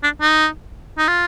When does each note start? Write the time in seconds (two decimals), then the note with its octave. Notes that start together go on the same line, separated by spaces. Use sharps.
0.04 D4
0.21 D#4
0.98 D#4
1.08 F4